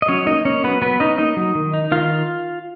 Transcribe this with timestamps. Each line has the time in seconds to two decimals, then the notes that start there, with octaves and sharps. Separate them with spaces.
0.02 D#5
0.08 F#3 C#4 C#5
0.26 A#3 D#4 D#5
0.45 A#3 C#4 C#5
0.64 F#3 B3 B4
0.82 F#3 B3 B4
1.00 C#4 D#4 D#5
1.18 A#3 D#4 D#5
1.37 F#3
1.55 D#3
1.74 D#4
1.92 D#3 F4 F5